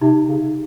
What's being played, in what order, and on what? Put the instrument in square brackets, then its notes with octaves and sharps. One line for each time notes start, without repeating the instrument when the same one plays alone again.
[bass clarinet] C3 [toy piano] D#4
[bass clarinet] C#3